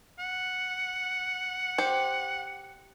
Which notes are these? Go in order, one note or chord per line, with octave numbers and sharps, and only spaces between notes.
F#5
G4 C5